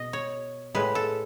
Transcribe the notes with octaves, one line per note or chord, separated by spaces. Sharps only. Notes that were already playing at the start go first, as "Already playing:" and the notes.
Already playing: B2 D#5
C#5
A2 G#3 B4
A4